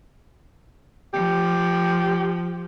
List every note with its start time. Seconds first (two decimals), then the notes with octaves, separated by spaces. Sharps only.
1.14 F3 G4